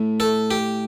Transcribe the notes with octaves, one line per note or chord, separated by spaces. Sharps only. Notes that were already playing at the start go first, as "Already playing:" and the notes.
Already playing: A2 A3
A4
G4